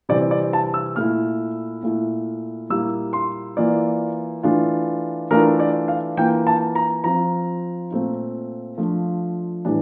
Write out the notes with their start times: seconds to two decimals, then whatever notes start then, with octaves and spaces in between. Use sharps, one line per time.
0.09 C3 E3 G3 C4 D5
0.31 D5
0.53 A5
0.74 E6
0.96 A#2 A3 E4 F6
1.83 A#2 A3 E4
2.69 A#2 G3 A#3 E4 E6
3.13 C6
3.57 E3 A#3 F4 D5
4.43 E3 A3 D4 F4
5.31 E3 A3 D4 F4 A#4
5.60 D5
5.88 F5
6.17 E3 A#3 F4 G5
6.47 A5
6.75 A#5
7.04 F3 C4 F4 A#5
7.91 A#2 A3 C4 F4
8.78 F3 A3 D4 F4
9.65 A2 E3 G3 D4